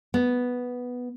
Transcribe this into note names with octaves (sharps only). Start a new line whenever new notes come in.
B3